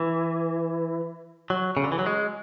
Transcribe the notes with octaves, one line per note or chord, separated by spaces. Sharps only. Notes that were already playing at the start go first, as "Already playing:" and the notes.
Already playing: E3
F#3
C#3
D3
E3
F#3
G#3